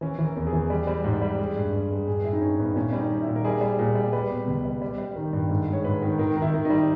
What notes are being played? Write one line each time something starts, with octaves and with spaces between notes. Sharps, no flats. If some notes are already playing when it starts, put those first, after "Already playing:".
E3 C#4
E3
A#4
E2
G#4
E3
G3
G3
G#2
G3
G#3
G2
G2
G#3
G2 G#4
G2 E4
D#4
G2 C#4
G2 B3
A#2 C#4
G3 C#4
D#4
G3
E4
A#2
A#4
G3 G#4
G3
A#2 G#4
G3
G3 B4
B2
C#2
G3
G3
G3
D#3
G2
G#2
G#3
C#5
G#2 B4
D#3
D#3 A#4
D#3
E4
D#3
G3 D#4